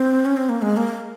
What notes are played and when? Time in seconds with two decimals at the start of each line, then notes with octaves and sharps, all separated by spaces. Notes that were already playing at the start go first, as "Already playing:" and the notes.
Already playing: C4
0.25 C#4
0.37 C4
0.49 A#3
0.62 G#3
0.77 A#3